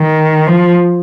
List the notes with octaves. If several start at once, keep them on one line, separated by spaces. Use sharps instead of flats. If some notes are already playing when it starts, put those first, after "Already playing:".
Already playing: D#3
F3